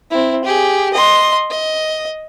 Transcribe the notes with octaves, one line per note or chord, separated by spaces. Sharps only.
C4 E4
G4 G#4
D#5 C6
D#5